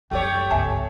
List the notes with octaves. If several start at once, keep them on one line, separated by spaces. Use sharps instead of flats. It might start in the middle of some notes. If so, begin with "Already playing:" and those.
F#2 G3 A3 G4 C#5 G5
G1 C#2 E5 G#5 A5